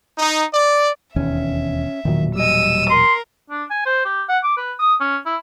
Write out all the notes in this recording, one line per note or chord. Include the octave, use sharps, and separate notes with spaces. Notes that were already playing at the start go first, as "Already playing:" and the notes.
D#4
D5
E1 D#2 C#4 E5
E1 A#2 D#3 F#3
G3 D#5 E6 D#7
A#4 C6
D4
G#5
C5
G4
F#5
D6
B4
D#6
C#4
E4